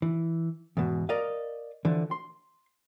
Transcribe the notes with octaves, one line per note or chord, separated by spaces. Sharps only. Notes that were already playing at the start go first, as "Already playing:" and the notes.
E3
E2 G#2 B2
A#4 D5 D#5 F5
D3 E3 F3
C6